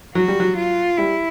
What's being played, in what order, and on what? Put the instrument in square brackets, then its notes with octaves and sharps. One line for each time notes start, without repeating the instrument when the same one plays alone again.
[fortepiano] F#3 [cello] F#4
[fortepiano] G3
F#3
[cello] F4
[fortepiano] G3 [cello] E4